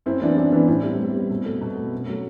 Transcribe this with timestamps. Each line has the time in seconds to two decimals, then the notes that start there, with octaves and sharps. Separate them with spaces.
0.06 F#2 C4 E4
0.22 E3 B3 D4
0.37 F#2 D4
0.52 E3 B3 D4
0.68 A2 C4 E4
0.83 G3 B3
0.99 A2
1.15 G3 B3
1.30 B2
1.45 A3
1.61 B2
1.77 A3
1.93 F#2
2.07 F#3 A3